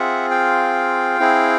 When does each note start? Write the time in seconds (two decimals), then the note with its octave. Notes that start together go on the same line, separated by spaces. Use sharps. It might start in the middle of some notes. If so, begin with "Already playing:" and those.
Already playing: C4 F4 G#4 E5 F#5
0.31 F5 G5
1.20 C4 E4 G#4